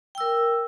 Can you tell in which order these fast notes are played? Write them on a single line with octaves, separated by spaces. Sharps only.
G5 E6 A#4